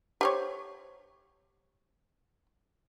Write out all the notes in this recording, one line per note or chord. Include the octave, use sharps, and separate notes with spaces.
G4 C5 C#5